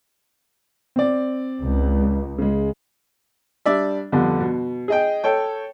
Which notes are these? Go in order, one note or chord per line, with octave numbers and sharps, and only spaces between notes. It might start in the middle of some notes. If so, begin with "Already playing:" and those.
C4 D5
C#2
C#3 G#3
G3 D4 D5 E5
F2 D3 G3 B3 D4
B2
G#4 D#5 G5
A4 C#5 G5